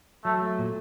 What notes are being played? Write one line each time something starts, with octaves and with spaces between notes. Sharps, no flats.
F#3 A3
A3
A#2